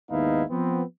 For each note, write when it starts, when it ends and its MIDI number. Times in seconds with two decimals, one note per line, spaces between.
0.11 0.43 39
0.11 0.43 44
0.11 0.43 59
0.11 0.43 63
0.11 0.43 64
0.11 0.43 77
0.50 0.83 53
0.50 0.83 59
0.50 0.83 60